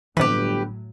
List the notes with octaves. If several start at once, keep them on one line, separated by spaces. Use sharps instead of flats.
G1 A2 C3 E3 F#3 G4 B4